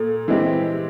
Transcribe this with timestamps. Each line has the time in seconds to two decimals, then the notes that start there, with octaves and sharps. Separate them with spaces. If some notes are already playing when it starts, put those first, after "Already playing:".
Already playing: A#2 A4
0.28 E3 G#3 C4 E4 G4